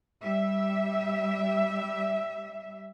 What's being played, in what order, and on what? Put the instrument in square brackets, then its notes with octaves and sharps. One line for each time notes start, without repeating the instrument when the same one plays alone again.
[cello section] G3 E5